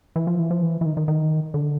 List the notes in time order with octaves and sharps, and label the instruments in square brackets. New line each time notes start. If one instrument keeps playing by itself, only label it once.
[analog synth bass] E3
F3
E3
F3
E3
E3
D#3
D#3
D#3
D3